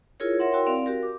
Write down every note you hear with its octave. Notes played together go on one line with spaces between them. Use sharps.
E4 F4 G#4 A#4 C#5
A#4 C#5 E5 F#5 C6
E4 F#4 A#4 G5 C6
C4 D5 F5
F#4 G4 A#4
D6